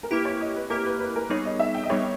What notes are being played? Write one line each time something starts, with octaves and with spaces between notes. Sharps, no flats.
A#4
A#3 E4 G4 B4
C#5
D#5
B4
A#3 E4 G4 A#4
B4
B4
A#4
G3 B3 D#4 G#4 C#5
D#5
E5
G5
D#5
G3 B3 D#4 G#4 C#5